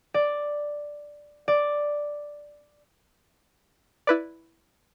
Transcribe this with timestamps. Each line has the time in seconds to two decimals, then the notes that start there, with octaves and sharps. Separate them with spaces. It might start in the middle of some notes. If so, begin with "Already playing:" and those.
0.14 D5
1.48 D5
4.07 E4 B4 D5